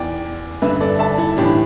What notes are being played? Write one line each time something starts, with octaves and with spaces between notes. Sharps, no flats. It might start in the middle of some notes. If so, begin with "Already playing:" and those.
Already playing: E2 E3 D5 G5
G2 D3 B4 E5
A4 D5
E5 A5
E4 A4
A2 E3 D4 G4